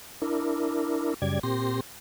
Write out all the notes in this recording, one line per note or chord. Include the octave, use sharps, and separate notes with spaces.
D4 E4 A#4
F#2 C#3 G3 D5 G#6
A#2 C4 G4 C6 A#6